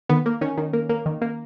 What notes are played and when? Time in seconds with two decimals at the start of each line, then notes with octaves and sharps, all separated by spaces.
0.09 D#3 B3
0.26 A#3
0.41 D#3 C#4
0.58 D#3
0.73 A#3
0.89 A#3
1.06 D#3
1.22 A#3